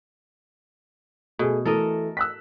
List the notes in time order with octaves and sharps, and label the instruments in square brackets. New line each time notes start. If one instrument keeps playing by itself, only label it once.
[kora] B2 [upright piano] A3 G#4
[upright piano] E3 A3 [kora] A4 A#4 D#5
[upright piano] E6 F#6 B6